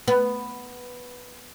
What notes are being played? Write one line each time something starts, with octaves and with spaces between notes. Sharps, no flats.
B3